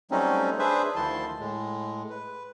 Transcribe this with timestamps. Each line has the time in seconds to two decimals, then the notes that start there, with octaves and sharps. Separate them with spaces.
0.11 F#3 G3 A3 C4 C#4 D#4
0.59 D4 G#4 B4 C5 E5
0.96 D2 D#3 F3 E4 A5 C6
1.39 A2 G#3
2.10 B4